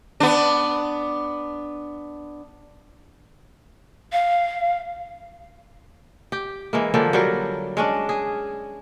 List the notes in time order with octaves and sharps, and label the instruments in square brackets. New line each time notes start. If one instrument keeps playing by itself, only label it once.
[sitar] B3 D4
[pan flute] F5
[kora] G4
E3 G#3 A#3
D3 F3 A#3
F#3 G3 A#4
G#3 C#4 D4
G#4